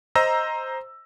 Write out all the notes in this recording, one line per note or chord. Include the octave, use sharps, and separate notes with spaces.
C5 D#5 A#5 E6 A#6